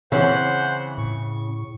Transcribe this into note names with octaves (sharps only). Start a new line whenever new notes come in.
C#3 E3 C4 C5 F#5
A2 C#6